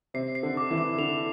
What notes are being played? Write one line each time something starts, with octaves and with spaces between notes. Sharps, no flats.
C3 C7
C7
D3
D6
E3
D6
D3 F7